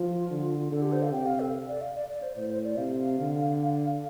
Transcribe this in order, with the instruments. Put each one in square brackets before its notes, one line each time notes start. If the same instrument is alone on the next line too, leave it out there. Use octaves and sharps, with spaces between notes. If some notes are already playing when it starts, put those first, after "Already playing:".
Already playing: [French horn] F3 [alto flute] F4
[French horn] D3
[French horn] D3 [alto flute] A4
[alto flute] G4
C5
F5
[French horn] C3 [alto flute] G5
[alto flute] F5
A4
D5
F5
D5
D5
C5
[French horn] A2 [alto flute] C5
[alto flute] C5
D5
[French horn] C3 [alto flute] F5
[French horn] D3